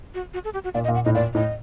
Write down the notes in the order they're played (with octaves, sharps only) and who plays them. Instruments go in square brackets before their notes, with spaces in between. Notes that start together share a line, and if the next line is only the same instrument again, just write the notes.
[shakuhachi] F#4
F#4
A4
G4
F#4
[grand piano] A#2 [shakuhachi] D5
[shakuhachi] D#5
[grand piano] A#2
[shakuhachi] F#5
[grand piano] A2 [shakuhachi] D#5
[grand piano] A#2 [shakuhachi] D5
[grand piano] A2 [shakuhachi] D#5